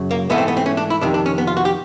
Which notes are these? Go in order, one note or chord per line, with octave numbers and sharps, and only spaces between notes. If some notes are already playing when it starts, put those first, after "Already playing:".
Already playing: F#2 C#3 F#3
A#3
G#2 E3 A3 B3
C4
B3
C4
C#4
D4
E4
F2 C3 D#3 D4
D4
C#4
B3
F4
F#4
G4